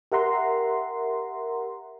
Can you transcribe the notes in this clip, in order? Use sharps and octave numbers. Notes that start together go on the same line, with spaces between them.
G4 A#4 E5 F#5 A#5 C6